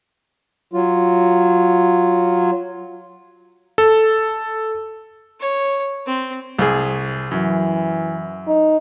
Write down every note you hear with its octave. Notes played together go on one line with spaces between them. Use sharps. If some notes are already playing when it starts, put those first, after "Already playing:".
F#3 F4
A4
C#5
C4
C2 G#4
F#2 E3
D#4